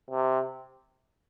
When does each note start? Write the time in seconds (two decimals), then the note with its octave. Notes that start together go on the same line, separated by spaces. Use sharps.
0.10 C3